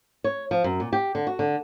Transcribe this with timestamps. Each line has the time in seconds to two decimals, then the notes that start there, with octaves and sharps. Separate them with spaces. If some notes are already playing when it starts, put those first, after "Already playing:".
0.24 C#5
0.51 F3
0.64 F#2
0.80 A#2
0.93 G4
1.15 D3
1.27 F#4
1.39 D3